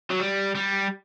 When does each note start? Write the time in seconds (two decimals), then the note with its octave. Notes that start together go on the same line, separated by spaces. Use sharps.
0.11 F#3
0.21 G3
0.55 G3